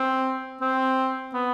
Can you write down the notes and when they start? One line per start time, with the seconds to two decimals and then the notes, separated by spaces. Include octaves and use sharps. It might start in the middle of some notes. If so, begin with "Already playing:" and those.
Already playing: C4
0.61 C4
1.34 B3